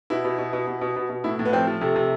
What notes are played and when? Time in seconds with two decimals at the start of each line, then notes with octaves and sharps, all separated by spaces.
0.10 B2 E4
0.25 B2
0.38 B2
0.53 B2
0.67 B2
0.81 B2
0.96 B2
1.10 B2
1.24 A2 E4
1.39 A2
1.45 B3
1.53 F3 C4
1.67 F3
1.81 C3 A3
1.96 C3